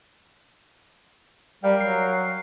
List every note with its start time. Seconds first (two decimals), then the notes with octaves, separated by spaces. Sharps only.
1.63 G3 A#4 F5 G5
1.80 F#3 C7